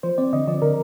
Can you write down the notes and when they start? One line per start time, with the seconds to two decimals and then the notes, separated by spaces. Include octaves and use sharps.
0.03 F3 C5
0.18 C4 D5
0.33 D3 D#5
0.48 F3 D5
0.62 D3 A#4